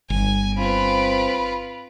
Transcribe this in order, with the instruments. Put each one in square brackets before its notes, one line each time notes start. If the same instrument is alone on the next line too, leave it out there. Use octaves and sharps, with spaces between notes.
[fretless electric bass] G1 [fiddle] G#5
[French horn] C4 [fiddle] F4 B4 [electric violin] B5 D7